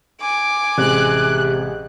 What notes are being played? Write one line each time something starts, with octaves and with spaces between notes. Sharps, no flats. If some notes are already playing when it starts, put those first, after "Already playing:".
G#5 D6
A1 C3 G#3 F#6